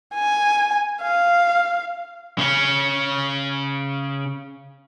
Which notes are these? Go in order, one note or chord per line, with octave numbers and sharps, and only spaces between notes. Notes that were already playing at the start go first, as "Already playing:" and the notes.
G#5
F5
C#3 C#4